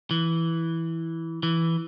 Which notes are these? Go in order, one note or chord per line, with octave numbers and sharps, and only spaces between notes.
E3
E3